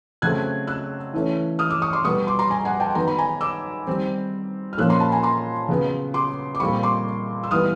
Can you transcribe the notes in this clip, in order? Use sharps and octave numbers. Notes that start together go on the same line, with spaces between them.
C#3 F#3 A3 C4 F#6 G#6
E6 F#6
E3 A3 C#4
D#6 F6
D6 E6
C#6 D#6
C6 D6
B2 G3 B3 C#6 D#6
C6 D6
A#5 C6
G#5 A#5
F#5 G#5
G5 A5
D#3 F#3 B3 A#5
B5
G#5 A#5
D6 E6
D#3 G3 C4
F6
A#2 F3 A#3 C#4 E6 F#6
A#5 C6
A5 B5
G#5 A#5
A#5 C6
C#3 F#3 B3
C6 D6
D6
A#2 G3 C4 B5 C#6
C6 D6
E6
E3 G3 B3 D#6 F6